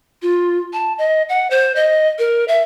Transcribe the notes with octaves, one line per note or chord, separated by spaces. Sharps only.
F4
A5
D#5
F#5
C5
D#5
A#4
E5